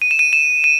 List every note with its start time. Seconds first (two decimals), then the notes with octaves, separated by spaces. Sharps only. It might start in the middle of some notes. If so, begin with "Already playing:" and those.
0.02 D#7
0.11 E7
0.19 D#7
0.33 E7
0.64 D#7